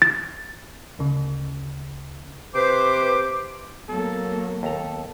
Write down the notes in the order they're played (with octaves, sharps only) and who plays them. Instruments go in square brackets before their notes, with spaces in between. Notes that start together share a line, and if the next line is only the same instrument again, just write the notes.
[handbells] A6
[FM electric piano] D2 C#3
[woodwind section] C3 B4 C5 D6
[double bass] F#3 A#3 [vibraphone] B3 [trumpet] A4
[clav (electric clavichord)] D#2 A#5 [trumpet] A4